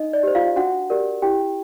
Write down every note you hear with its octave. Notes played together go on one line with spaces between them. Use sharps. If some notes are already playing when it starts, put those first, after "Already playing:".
Already playing: D#4 D#5
D5
G4 C5
F4 F5
D4 F#4 F#5
G4 A#4 D5
E4 G4 G5